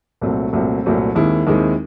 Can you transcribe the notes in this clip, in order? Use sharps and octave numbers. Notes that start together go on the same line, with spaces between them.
C2 A#2 F#3 A3 C4
C2 A#2 F#3 A3 C4
C2 A#2 F#3 A3 C4
D#2 D#3 G#3 C4 E4
D#2 D#3 G#3 C4 E4